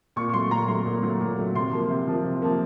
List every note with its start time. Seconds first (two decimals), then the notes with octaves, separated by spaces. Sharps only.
0.16 A#2 C#6
0.29 C#6
0.34 F#3 A3 C6
0.51 A#2 A#5
0.68 F#3 A3 C6
0.86 A#2
1.03 F#3 A3
1.21 A#2
1.39 F#3 A3
1.55 C3 C6
1.72 F3 A#3
1.90 C3
2.08 F3 A#3
2.25 C3
2.42 F3 A#3